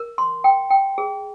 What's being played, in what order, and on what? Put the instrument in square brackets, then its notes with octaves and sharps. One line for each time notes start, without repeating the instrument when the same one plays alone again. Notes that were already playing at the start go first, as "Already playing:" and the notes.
Already playing: [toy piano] A#4
C6
G5
G5
G#4